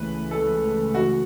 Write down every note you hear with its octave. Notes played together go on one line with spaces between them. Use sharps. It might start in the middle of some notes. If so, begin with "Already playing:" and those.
Already playing: C#2 C#3 E3 A3 B4
A4
F#4